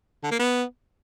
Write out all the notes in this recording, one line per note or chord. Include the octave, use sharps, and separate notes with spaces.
D3
A#3
B3